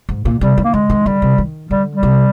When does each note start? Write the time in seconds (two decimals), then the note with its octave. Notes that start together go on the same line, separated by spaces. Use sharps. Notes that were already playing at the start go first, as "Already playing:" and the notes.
0.09 G#2
0.25 A#2
0.41 C3 G3
0.58 D#3
0.64 A#3
0.74 D3 G#3
0.90 D#3
1.06 D3 G3
1.22 C3
1.38 D#3
1.71 D3 G3
1.95 G3
2.03 C3